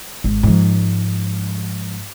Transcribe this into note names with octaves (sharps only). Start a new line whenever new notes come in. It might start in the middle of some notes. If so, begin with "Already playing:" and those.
G#1
G#2 F3